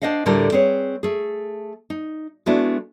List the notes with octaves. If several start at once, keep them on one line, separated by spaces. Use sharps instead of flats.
D4 C5 D#5 F5 F#5
D2 A2 D3 G3 A4 A#4
C4 G#4 B4 C#5
A3 G#4
D#4
G#3 A3 B3 D4 E4 F#4